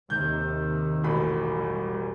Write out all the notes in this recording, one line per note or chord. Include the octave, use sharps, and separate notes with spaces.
D#2 C3 D#3 G6
E1 A1 B5
G3